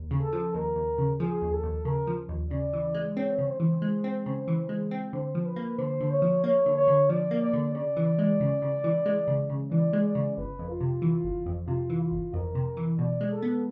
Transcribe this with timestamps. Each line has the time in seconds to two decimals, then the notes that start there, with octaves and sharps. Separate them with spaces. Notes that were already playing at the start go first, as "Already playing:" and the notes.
Already playing: D#2
0.11 C#3
0.21 A4
0.33 F3
0.54 D#2 A#4
0.76 D#2
0.98 C#3
1.20 F3 G#4
1.42 D#2
1.53 A4
1.63 D#2
1.85 C#3 A#4
2.07 F3
2.29 D#2
2.51 C#3 D5
2.73 E3
2.94 G#3
3.17 C4 C#5
3.39 C#3
3.49 C5
3.60 E3
3.82 G#3
4.04 C4
4.26 C#3
4.47 E3
4.69 G#3
4.91 C4
5.13 D3 C5
5.35 F3
5.45 B4
5.56 A#3
5.78 D3 C5
6.01 D3
6.11 C#5
6.22 F3
6.44 A#3 C#5
6.66 D3
6.76 C#5
6.88 D3
7.09 F3 D5
7.31 A#3
7.42 D5
7.53 D3
7.74 C#3 D5
7.96 E3
8.19 G#3
8.40 C#3
8.62 C#3
8.84 E3
9.06 G#3
9.28 C#3
9.50 C#3
9.72 E3 D5
9.93 G#3
10.04 D5
10.15 C#3
10.37 G1 B4
10.59 F2
10.69 F4
10.81 C3
11.02 E3
11.24 G1
11.46 F2
11.68 C3 F4
11.90 E3
12.01 F4
12.11 G1
12.33 F2 A#4
12.55 C3
12.77 E3
12.98 B2 D5
13.21 G#3
13.32 A4
13.42 B3